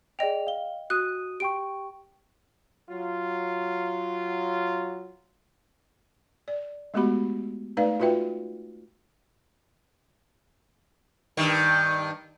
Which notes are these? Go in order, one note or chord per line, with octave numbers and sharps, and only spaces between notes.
G#4 D5 D#5 G5 F7
F5 G7
F#4 D#6 F#6 D#7
G4 G5 C#6 D7
F#3 F4
D5
G#3 A3 B3 F#4 G4 B5
A3 D#4 B4 D5 F5
F4 F#4 B4 E5 G5
G2 D#3